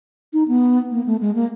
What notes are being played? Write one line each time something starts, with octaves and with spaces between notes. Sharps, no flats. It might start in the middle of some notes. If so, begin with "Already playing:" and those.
D#4
B3
A#3
A3
G#3
A#3